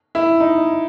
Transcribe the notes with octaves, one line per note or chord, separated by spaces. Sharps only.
E4
D#4